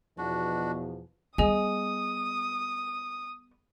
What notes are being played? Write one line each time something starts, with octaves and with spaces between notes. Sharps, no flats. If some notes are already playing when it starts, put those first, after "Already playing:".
E2 B2 F3 D4 F#4
G3 B3 G#4 D#5 G#5 D#6